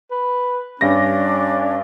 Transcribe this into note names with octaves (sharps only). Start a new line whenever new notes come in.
B4
G2 C#4 D4 A#6